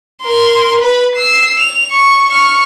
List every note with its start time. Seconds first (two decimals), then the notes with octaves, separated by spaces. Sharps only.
0.22 A#4 C6
0.80 B4 B5
1.15 E6 C7
1.60 F7
1.92 C#6
2.29 C#6 F6